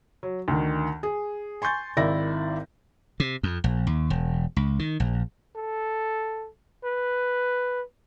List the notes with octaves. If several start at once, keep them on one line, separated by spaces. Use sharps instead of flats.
F#3
D2 D#3
G#4
G#5 C6 C#6 G6 A6
G#1 D#3 E4 D5 E5 A#6
C3
F2
A#1
D#2
E1
C#2
D#3
A#1
A4
B4